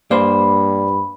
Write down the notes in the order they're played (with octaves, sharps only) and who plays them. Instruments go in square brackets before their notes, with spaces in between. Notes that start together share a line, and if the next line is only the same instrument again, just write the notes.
[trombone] G2 [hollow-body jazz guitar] A#3 C5 [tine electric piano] D5 [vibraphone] B5